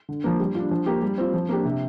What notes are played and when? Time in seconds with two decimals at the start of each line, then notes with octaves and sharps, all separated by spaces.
0.09 D3
0.24 F3 A#3
0.39 G3
0.55 D4 F4
0.71 F3
0.86 A#3 G4
1.02 G3
1.18 C4 F4
1.34 F3
1.49 A#3 D4 G4
1.65 C3